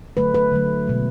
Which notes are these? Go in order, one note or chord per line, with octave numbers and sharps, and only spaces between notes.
D3 F#3 A3 B4
B4
D3 F#3 A3
B2 G#3